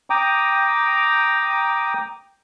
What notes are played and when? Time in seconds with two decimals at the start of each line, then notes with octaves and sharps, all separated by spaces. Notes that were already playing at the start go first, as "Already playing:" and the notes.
0.10 G5 A#5 D6 D#6